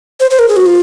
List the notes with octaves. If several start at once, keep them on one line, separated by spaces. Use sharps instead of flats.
C5
C5
A#4
G#4
F#4
F4